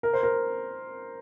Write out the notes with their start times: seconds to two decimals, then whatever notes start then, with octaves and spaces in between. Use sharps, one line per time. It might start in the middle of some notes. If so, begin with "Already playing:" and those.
0.03 A#4
0.13 C5
0.23 A#4